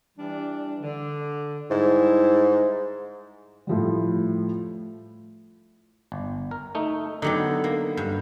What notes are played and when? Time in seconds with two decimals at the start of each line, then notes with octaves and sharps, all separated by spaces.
0.18 E3 G3 D4
0.82 D3
1.70 G#2 G3 E4
3.67 A2 F3 G3
6.12 G1
6.51 A#4
6.75 A3 D#4
7.22 D3 F#3 B3 D#4 G4
7.64 A#3
7.97 G2